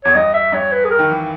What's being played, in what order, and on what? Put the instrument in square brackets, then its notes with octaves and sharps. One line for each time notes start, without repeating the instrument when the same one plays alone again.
[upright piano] E2 [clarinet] C#5
[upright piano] G2 [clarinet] D#5
[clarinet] E5
[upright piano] G2 [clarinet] C#5
[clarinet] B4
G#4
A#4
[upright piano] D#3
E3